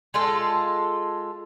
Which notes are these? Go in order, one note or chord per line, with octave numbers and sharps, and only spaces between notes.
G#3 F4 A4